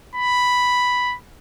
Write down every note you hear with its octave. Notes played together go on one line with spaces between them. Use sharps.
B5